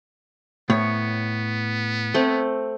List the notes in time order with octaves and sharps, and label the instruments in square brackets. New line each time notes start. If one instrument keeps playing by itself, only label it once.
[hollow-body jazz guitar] A2 [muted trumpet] B3 [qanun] C#5
[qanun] A3 C4